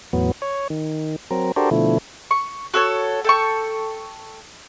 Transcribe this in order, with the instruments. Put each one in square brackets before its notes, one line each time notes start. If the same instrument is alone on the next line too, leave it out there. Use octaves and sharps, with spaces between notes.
[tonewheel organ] E2 A2 F#3 B3
C#5
D#3
F#3 C4 A#4
D4 F#4 G4 A4 A#4 C5
B2 D3 F3 A3 E4
[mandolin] C#6
F#4 A4 C#5
A4 G5 C#6